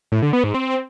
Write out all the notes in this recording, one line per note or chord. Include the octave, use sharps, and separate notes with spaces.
A2
D3
B3
G#2
C4